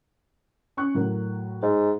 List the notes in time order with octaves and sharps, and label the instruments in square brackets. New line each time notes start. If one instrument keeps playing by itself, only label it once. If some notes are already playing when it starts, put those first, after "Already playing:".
[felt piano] C#4 C#6 F#6
A2 F#3 A#4
[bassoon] G#2